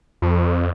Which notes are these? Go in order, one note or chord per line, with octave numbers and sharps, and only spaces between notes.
F2